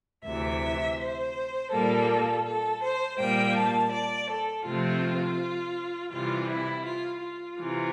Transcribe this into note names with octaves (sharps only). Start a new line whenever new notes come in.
D2 C3 E3 E5
C5
A#2 G3 A#3 A4
A4
C5
A#2 G3 A#3 G5
A5
D5
A4
C3 F3 A3 C4 F4
C3 E3 G3 F4
E4
F4
F4
C3 E3